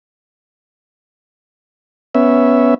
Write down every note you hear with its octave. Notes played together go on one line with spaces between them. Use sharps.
B3 C#4 E5